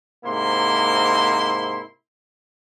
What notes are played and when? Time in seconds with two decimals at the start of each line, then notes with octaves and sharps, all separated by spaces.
0.25 G#2 C3 A#3 E4 C6